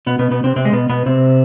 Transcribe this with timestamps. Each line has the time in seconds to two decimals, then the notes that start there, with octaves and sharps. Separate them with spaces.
0.06 B2 B3
0.19 B2 B3
0.31 B2 B3
0.44 C3 C4
0.56 C3 C4
0.65 G#3
0.73 B2 B3
0.89 B2 B3
1.06 C3 C4